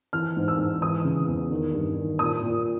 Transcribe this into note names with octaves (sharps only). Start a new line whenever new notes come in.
E3 F6
G#2
E6
G#2
E3 D#6
C#3
E2
D#3
G2
D#3
A#2 D#6
A#2